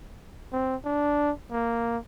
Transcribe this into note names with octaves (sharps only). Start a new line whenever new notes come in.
C4
D4
A#3